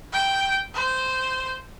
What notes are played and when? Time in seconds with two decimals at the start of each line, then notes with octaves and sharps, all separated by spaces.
0.13 G5
0.74 C5